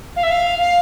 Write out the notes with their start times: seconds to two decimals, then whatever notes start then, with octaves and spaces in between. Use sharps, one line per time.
0.16 F5
0.23 E5
0.31 F5
0.59 F5